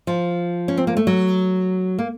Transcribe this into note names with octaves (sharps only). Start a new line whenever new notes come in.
F3
C#4
C4
A#3
A3
F#3
A#3